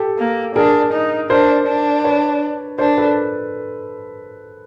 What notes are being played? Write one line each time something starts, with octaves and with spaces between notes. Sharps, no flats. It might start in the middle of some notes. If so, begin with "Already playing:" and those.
Already playing: G4 A4
A#3
D4 G#4 A#4
D#4
D4 A#4 C5
D4
B4 C#5
D4 A#4 C5
A4 B4